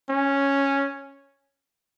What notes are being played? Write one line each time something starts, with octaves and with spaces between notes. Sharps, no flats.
C#4